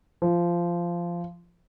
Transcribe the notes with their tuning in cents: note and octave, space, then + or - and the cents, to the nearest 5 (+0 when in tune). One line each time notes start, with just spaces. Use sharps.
F3 -15